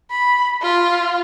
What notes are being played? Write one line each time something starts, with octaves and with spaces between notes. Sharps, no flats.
B5
F4